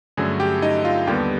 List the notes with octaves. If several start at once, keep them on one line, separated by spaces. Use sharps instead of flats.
G2 D3 F#3 A3 C#4 G#4 G#5
G4 G5
D#4 D#5
F4 F5
D#2 D3 G3 B3 G4 G5